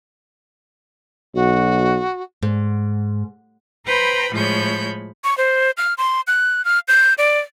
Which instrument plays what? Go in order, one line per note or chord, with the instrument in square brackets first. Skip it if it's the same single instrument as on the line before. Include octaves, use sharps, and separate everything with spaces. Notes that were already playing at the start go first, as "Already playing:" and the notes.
[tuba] B1 [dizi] F#4
[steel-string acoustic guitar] G#2
[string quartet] B4 C5 G5 A#5 B5
A2 F3 G#3 C#5 B5 G6
[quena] C#6
C5
F6
C6
F#6
F6
G6
D5